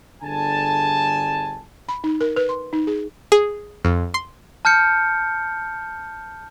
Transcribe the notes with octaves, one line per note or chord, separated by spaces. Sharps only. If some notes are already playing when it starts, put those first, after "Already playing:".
G1 D3 G#4 G#5 A5
B5
D#4
A#4
B4
C6
D#4
G#4
G#4
F2
C6
A5 F6 G6 C#7